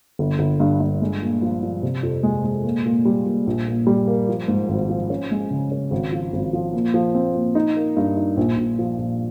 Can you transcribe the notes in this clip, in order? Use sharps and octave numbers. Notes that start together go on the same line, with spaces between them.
G1
G1
G2
G2
G#3
A#2
F3
F3
C3
F2
G#3
G#3
A#2
A#2
G3
A#2
A#1
A#2
G3
A#3
F3
G#2
G#1
F3
C#4
G#3
C#3
C#4
G#1
F3
G#1
F3
A#2
F3
C4
A#2
D#4
A#3
G2
D#4
A#1
A#1
F3
A#1